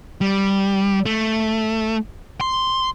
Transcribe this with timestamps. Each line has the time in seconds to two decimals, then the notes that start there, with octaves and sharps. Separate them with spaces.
0.21 G3
1.06 A3
2.41 C6